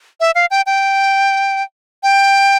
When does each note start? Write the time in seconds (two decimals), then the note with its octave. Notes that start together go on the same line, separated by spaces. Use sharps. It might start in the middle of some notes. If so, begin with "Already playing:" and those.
0.20 E5
0.35 F5
0.51 G5
0.66 G5
2.03 G5